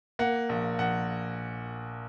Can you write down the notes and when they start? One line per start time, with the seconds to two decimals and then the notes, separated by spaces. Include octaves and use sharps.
0.19 A#3 F#5
0.49 A#1
0.79 A#1 F#5